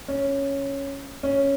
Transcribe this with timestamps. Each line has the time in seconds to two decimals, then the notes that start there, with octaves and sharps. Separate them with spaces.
0.08 C#4
1.23 C#4